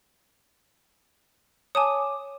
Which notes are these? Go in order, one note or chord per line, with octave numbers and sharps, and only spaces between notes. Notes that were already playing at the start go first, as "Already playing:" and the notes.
C#5 G#5 A5 D6 D#6